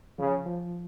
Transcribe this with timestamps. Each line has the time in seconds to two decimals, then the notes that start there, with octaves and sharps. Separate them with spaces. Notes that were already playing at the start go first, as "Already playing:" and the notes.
0.18 C#3 F3
0.46 F3